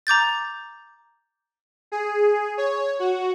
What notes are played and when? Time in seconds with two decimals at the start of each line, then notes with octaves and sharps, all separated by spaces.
0.07 A#5 D6 G6 A6
1.92 G#4
2.57 C#5
2.99 F#4